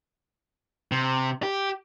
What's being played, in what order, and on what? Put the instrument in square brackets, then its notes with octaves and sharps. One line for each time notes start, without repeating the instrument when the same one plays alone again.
[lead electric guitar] C3
G4